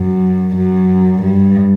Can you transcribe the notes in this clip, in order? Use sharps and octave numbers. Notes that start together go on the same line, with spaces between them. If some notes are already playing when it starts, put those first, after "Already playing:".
Already playing: F#2
F#2
G2